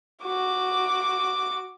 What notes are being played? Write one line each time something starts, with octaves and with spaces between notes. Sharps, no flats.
F#4 D6